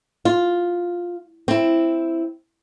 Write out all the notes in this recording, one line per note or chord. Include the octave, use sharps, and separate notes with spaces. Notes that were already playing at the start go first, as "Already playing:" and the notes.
F4
C4 E4